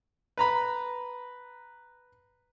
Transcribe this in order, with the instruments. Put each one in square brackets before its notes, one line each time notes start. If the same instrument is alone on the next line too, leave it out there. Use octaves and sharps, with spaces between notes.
[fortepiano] B4 A#5 B5